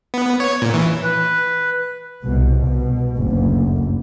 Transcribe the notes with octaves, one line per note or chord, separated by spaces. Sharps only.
B3
C#5
A#2
E3
B4
C2 B2
B2
F#1 D2